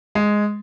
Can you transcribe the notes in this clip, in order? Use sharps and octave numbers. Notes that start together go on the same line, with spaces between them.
G#3